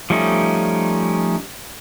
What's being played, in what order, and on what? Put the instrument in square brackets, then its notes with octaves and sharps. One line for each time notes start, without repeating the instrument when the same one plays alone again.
[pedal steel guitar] F3 G3 A3 C#4 D#4